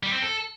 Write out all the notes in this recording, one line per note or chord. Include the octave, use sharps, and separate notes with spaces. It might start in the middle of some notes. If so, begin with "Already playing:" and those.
G3
C4
A4